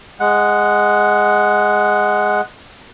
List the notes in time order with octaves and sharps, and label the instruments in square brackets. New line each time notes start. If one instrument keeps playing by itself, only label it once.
[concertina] G#3 F#5